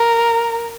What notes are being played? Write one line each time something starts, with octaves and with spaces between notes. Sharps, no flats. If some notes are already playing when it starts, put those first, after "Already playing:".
Already playing: A#4